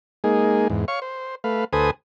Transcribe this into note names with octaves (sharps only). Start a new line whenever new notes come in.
G#3 A#3 D#4 G#4
E2 G#2
C#5 F5 C#6
C5
A3 B4 F5
D2 A4 B4 C5 G#5 D#6